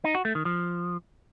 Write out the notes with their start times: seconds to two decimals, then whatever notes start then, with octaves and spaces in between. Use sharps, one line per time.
0.04 D#4
0.15 F#4
0.25 A3
0.35 D#3
0.45 F3